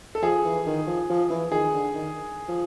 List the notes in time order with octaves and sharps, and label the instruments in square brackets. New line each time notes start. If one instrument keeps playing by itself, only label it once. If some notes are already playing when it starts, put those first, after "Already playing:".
[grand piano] A4
[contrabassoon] F3 [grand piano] G#4
[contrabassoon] E3
D#3
F3
F3
E3
[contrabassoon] D#3 [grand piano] G#4
[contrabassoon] D3
D#3
F3